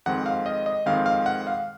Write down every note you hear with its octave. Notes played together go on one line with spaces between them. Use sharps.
F2 D#3 G#3 C4 F#5
F5
D#5
D#5
F2 D#3 G#3 C4 F5
F5
F#5
F5